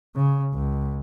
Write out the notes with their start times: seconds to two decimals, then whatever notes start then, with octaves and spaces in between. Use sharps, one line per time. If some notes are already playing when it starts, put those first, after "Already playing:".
0.16 C#3
0.54 C#2